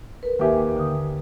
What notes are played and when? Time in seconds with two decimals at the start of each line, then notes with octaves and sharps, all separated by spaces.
0.23 A#4 B4
0.39 D#2 G4 A#4 E5 G#5
0.77 D3 D#6